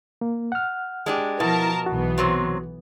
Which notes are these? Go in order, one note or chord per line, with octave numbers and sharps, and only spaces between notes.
A#3
F#5 F6
G#3 D4 G4
B2 F3 E4 A#4 A5
B1 E3 B3 F#4
C3 F#3 C4